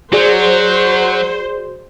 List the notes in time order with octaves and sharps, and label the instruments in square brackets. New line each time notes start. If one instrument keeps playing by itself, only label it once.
[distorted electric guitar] F#3 [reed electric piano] F#4 G#4 D5 [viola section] C5